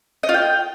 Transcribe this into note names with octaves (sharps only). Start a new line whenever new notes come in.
D#5
F4
G5